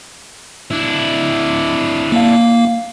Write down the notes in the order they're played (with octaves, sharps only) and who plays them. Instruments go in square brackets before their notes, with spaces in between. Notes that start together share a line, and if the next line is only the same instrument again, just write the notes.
[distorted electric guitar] D4 E4
[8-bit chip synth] A#3 F5